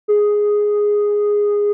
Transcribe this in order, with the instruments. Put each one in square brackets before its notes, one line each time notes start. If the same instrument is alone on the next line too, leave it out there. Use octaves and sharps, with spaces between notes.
[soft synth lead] G#4